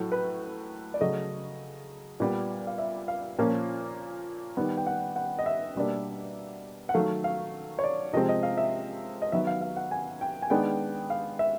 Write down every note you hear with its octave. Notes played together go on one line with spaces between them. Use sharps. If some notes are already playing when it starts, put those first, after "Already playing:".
Already playing: A2 F#3 A3
B4
D5
C#3 F#3 A3 D#5
A#2 G3 B3
F5
E5
F5
A#2 F3 A#3 C#4
D#3 G3 B3
G5
F#5
F#5
D#5
E5
B2 G3 A#3 D4
F#5
D#3 F#3 A3 F5
F5
C#5
D5
C3 F3 G#3 C4 D#5
D#5
F5
E5
D#5
D#3 F#3 B3 E5
F5
F5
F#5
G#5
G5
G#5
D#3 G#3 B3 D4 G5
F5
E5